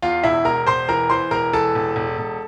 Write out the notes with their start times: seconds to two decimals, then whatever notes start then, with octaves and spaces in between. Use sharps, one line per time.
0.02 E2 F4 F5
0.23 E1 E4 E5
0.45 E1 A#4 A#5
0.67 E1 C5 C6
0.89 E3 A#4 A#5
1.10 E3 C5 C6
1.31 E1 A#4 A#5
1.53 E3 A4 A5
1.75 E1
1.96 E1
2.18 E1